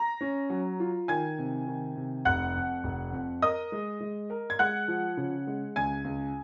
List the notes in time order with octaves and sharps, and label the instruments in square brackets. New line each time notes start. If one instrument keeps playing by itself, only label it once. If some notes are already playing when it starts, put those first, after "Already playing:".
Already playing: [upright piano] A#5 A#6
[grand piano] C#4
F#3
F4
[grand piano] D#3 [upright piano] G#5 G#6
[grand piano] C3
D#3
C3
[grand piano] F1 [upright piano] F#5 F#6
[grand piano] F2
F1
F2
[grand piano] A#4 [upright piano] D#5 D#6
[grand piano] G#3
G#3
A#4
[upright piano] G#6
[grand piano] G#3 [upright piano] F#5 F#6
[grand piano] F3
C#3
G#3
[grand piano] C#2 [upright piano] G#5 G#6
[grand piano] C#2